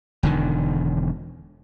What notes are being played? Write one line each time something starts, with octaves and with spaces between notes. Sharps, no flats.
E1 D3 D#3